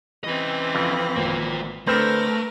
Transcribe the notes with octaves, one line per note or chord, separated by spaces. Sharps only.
E3 C4 C#4 D#5
F2
G#1 A#3 F4
D3 A3 C4 A#4 B4 F6